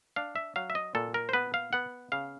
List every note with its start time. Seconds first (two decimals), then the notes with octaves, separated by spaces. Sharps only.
0.16 D4 F5
0.36 E5
0.56 F#3 F5
0.70 E5
0.75 D#5
0.95 A#2 A4
1.14 A#4
1.29 C5
1.33 B3 B4
1.54 F5
1.73 B3 F#5
2.12 C#3 F5